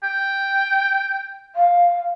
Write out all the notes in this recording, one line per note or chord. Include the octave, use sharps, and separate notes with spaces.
G5
F5